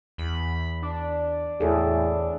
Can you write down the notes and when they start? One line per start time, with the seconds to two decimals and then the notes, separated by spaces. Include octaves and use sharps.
0.18 E2 B5
0.82 D4
1.60 E2 A2 G#4 A4